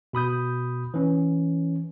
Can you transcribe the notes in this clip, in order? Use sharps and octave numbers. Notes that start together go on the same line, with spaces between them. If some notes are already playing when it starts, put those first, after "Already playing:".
B2 B5 D#6 G6
E3 C#4